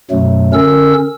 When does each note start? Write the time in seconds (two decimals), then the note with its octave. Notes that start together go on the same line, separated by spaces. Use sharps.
0.11 F#2 B2 F#3 A3
0.53 D3 C#4 A#4 E6